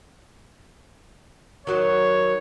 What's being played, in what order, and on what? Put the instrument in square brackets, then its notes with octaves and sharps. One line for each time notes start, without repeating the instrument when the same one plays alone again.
[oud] D#3 F#3 [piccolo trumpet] C#5